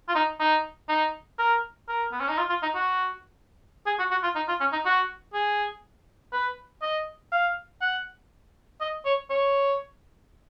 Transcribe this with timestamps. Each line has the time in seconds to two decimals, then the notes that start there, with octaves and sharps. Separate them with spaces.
0.09 F4
0.15 D#4
0.40 D#4
0.89 D#4
1.39 A#4
1.89 A#4
2.12 B3
2.20 C#4
2.29 D#4
2.38 F4
2.50 F4
2.63 D#4
2.75 F#4
3.87 G#4
3.99 F#4
4.11 F#4
4.23 F4
4.36 D#4
4.48 F4
4.61 C#4
4.73 D#4
4.86 F#4
5.34 G#4
6.33 B4
6.83 D#5
7.32 F5
7.82 F#5
8.81 D#5
9.06 C#5
9.30 C#5